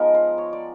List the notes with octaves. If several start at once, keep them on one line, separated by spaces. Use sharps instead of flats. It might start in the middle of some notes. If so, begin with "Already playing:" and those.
Already playing: F3 G#3 B3 D#4 A#4
C5
C#5
D5